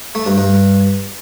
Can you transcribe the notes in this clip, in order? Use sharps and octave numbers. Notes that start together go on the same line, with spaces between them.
A3
G2
G2